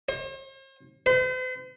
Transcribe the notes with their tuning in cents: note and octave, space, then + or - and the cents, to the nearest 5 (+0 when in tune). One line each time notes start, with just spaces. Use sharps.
C5 +45
C5 -45